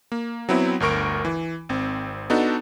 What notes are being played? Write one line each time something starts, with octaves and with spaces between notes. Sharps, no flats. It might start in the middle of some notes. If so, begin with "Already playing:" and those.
A#3
F#3 B3 C4 E4
G1 D2 A#4 C#6 D7
E3
G#1 C4
B3 D4 D#4 F#4 A4